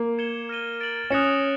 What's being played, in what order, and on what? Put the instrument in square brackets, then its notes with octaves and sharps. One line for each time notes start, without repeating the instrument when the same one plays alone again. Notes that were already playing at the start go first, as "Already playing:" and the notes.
Already playing: [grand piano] A#3
[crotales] G#6 C#7 E7 G7
F6 A#6 D#7 G7
A6 D7 F#7
[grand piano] C#4 [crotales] D#6 F#6 A#6 C#7 E7